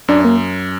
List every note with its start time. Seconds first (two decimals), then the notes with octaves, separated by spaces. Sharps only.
0.08 F#2 D4
0.25 A#3